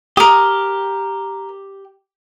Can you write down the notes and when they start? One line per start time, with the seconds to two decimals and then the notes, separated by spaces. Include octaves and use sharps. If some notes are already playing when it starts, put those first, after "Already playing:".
0.17 G4 A#4 D#6